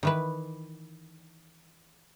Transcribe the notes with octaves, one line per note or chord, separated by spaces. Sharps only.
D#3 E3 B4